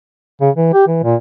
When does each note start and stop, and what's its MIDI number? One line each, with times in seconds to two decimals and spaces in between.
0.41 0.50 49
0.56 0.71 52
0.74 0.87 67
0.88 1.01 52
1.03 1.15 46